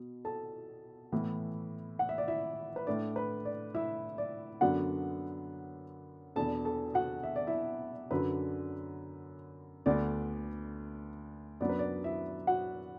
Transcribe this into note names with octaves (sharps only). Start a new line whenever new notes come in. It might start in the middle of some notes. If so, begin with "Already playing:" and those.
Already playing: B2
A4 A5
A2 E3 B3
F#5
E5
D5
E4 E5
B4
A2 A3 D4 D5
B4
D5
E4 E5
D5
F#2 D3 F#3 B3 D4 F#4 F#5
E2 B2 B3 D4 A4 A5
A4 A5
F#4 F#5
E5
D5
E4 E5
F#2 D3 F#3 D4 B4
D2 D3 B3 D4 D5
F#2 F#3 B3 D4 D5
B4
D5
E4 E5
F#4 F#5